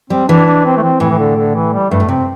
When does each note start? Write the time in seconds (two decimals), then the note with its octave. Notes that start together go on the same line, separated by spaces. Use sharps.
0.10 G3 C4
0.28 E3 D4
0.46 D4
0.65 C4
0.77 A3
0.83 C4
1.00 A2 E3
1.10 E3
1.18 D3
1.37 D3
1.55 E3
1.73 G3
1.90 G2 A3
2.00 A2
2.08 C3 C4